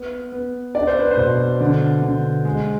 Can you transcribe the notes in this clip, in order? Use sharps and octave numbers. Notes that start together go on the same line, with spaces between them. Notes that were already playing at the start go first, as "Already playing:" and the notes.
Already playing: B3
B3
D4 D5
C5
B4
C5
B2
D3
D3
G#3